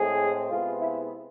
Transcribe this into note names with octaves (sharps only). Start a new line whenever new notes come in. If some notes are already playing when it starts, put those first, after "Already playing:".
Already playing: A2 G#3 C4 G#4
C3 G#3 B3 F4
E4